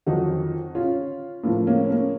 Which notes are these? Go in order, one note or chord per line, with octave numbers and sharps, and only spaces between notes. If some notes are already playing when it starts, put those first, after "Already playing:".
F2 D#3 F#3 D#4 F#4
C#4 F4
A2 F3 A#3
A#3 C#4
A#3 C#4